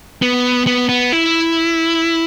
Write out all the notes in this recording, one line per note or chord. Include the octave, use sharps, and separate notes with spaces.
B3
B3
B3
E4